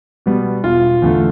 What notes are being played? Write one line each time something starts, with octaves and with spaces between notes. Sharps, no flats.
B2 G3 B3
E1 F4
E2 D3 A3